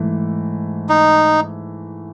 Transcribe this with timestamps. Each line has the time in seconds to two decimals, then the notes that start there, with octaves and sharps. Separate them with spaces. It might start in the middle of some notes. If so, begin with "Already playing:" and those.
Already playing: G#2 E3 A3
0.89 D#4